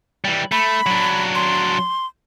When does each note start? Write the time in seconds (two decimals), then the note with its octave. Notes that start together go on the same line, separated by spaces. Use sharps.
0.25 E3 G3
0.52 A3 B5
0.86 F#3 D4
1.35 C6